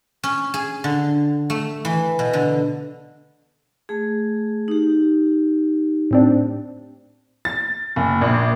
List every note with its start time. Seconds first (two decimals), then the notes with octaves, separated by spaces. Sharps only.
0.23 C#4
0.54 G#4
0.84 D3
1.50 A3
1.85 E3
2.19 B2
2.33 D3
3.89 A3 G#4
4.68 D#4 G4
6.11 A2 C4 D4
7.45 A6
7.96 F#1
8.21 A#1